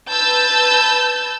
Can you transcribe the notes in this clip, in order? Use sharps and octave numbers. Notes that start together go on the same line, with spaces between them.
B4 A5 E6 G6 A6